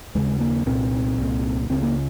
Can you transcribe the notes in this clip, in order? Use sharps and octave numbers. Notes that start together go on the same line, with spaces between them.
D#2 C#3 G#3
A#3
C2 A#2 C4
C2 A#2
C#2 C#3 C4
A#3